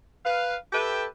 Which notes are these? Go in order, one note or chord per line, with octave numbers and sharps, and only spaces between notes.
B4 F5
G4 A4 B4 E5 G5